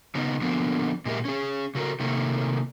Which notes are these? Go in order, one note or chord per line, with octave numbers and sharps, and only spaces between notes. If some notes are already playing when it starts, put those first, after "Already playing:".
C#3 B3 D#4
D3 F3 A#3 B3
A#2 G#3 G4 A#4 E5
C#4 G#4
C#3 F#4 A4 A#4
C3 D#3 A3 A#3